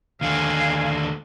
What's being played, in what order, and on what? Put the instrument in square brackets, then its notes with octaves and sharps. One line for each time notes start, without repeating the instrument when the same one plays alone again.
[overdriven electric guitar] D#2 D3 [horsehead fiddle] F5 G#5